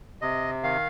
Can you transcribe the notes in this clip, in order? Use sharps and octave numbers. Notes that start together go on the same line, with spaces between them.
C3 D#5
D#3 F5